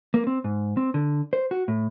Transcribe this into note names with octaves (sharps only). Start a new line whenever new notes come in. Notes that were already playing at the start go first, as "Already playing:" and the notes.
A#3
C4
G#2
C4
D3
C5
F#4
A2